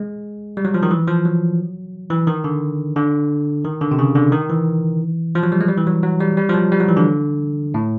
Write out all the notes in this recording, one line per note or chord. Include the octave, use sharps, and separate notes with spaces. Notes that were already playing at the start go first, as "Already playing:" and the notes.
Already playing: G#3
G3
F#3
F3
D#3
E3
F3
F#3
E3
D#3
D3
D3
D#3
D3
C3
C#3
D3
D#3
E3
F3
F#3
G3
G#3
G3
E3
F#3
F#3
G3
G3
F3
F#3
G3
F#3
E3
D3
A2